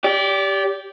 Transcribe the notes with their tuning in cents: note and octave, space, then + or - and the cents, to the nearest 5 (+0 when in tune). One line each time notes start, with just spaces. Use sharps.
G4 +0 D5 -30